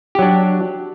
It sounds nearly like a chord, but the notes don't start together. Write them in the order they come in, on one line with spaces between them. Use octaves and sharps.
G4 F#3 D4